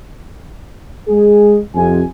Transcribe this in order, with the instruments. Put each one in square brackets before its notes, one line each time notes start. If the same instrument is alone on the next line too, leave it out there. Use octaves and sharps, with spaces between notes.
[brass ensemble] G#3 G#4
F2 C3 G#5